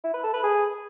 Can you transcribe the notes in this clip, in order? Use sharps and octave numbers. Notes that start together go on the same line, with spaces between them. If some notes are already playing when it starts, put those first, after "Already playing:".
E4
B4
A4
B4
G#4